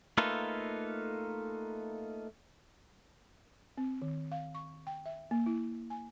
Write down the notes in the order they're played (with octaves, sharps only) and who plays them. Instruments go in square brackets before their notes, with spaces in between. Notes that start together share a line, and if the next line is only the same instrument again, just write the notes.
[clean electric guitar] A3 A#3 D#4 F4 A4 B4
[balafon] C4
D#3
F5
C#6
G5
E5
A#3
E4
G#5